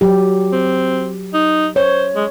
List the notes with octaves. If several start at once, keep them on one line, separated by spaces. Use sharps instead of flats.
F#3 G4
C4
D#4
C5 C#5
G#3